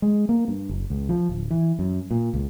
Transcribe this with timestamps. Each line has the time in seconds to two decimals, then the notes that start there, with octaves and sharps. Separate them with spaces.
0.02 G#3
0.29 A#3
0.48 G2
0.69 F#1
0.90 C#2
1.09 F3
1.29 D1
1.51 E3
1.79 F#2
2.11 A#2
2.34 C#2